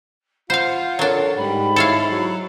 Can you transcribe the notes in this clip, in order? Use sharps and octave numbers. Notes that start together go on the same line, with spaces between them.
F4 C5 F5 F#5
F#3 D4 A4 A#4 C#5
G#2 G3 B5
E4 A4 C#5 F5
F#3